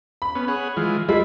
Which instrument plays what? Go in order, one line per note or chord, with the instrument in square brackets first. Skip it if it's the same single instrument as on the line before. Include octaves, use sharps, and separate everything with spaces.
[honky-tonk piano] B5
[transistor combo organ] B3 C#4
G#4 C#5 F#5
E3 G#3 F4
[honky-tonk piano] F3 G#3 [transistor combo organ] E4 B5